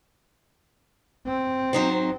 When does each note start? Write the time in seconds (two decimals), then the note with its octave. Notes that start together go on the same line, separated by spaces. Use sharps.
1.27 C4
1.73 F#3 D#4 C5